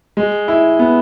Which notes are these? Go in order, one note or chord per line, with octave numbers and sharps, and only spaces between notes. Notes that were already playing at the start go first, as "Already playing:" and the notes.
G#3
E4
B3